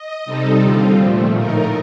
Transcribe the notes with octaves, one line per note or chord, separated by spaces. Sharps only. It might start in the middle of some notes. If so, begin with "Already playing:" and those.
Already playing: D#5
C3 G3 C4 D#4 A4
D#2 D3 G3 C4 F4
A#2 F3 A3
A2 A3 D#4 A#4